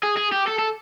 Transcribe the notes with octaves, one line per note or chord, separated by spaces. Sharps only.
G#4
G#4
G4
A4
A4